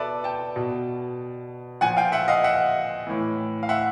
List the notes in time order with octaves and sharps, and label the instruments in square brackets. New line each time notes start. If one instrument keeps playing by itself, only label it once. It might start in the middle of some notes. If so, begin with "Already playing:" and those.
Already playing: [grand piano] B2 A4 B4 D5 E5
G5 A5
B2
A#2 F3 F#5 G#5
F5 G5
E5 F#5
D#5 F5
E5 F#5
A2 E3
F5
E5 F#5